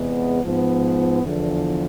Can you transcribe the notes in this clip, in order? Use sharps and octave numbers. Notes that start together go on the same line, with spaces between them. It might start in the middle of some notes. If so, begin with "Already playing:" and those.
Already playing: E2 C3 G#3 B3
G#2 F3 B3
E2 D3 F3